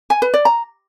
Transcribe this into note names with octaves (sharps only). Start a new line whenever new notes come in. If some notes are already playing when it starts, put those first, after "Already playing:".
G#5
B4
D5
A#5